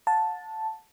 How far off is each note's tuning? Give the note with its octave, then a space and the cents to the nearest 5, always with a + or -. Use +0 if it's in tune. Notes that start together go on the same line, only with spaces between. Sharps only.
F#5 -45 A5 +0